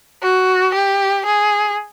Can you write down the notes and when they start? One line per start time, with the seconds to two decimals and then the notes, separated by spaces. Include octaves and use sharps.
0.22 F#4
0.74 G4
1.26 G#4